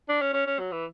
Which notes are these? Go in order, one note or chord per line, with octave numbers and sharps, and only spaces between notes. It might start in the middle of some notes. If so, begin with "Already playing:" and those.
D4
C#4
C#4
C#4
F#3
E3